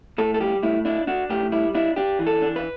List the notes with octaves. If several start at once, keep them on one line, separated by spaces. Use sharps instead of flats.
A2 A4
A4
G3 G4
A2 E4
D4 E4
D4 F#4
A2 G4
G3 E4
D4 E4
D4 G4
E3
A4
D4
B4